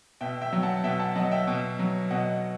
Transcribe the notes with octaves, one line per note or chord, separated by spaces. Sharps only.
B2 E5 G5
E5 G5
F#3
F#5 A5
B2 E5 G5
F#5 A5
F#3 D#5 F#5
E5 G5
B2
F#3
B2 D#5 F#5